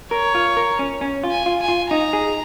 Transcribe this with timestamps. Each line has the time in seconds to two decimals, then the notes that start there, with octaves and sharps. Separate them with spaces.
0.11 A#4 C#5
0.35 F4
0.57 A#4
0.79 C#4
1.01 C#4
1.24 F4
1.31 G#5
1.46 F4
1.61 G#5
1.68 F4
1.91 D#4 A#5
2.13 G#4